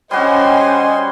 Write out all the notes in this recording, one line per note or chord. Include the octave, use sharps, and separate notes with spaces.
G3 C#4 F#4 C5 D#5 G#5 C6